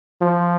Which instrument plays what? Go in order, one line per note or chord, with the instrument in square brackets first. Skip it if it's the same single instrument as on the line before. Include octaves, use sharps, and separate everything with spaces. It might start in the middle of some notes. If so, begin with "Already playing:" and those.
[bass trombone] F3